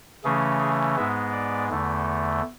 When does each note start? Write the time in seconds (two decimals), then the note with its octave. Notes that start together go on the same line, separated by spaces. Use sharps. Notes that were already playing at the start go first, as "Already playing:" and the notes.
0.24 C#3 E3 A3 C#4 G#4
0.60 G#4
0.96 G#2 G#3 B3 E5
1.32 D5
1.69 E2 D3 A3